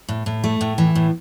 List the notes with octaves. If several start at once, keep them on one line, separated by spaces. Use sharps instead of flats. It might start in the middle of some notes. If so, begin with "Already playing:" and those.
A2
A2
A3
A2
E3
A2